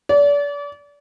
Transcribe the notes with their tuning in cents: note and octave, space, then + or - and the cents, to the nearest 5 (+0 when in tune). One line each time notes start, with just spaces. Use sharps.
D5 -35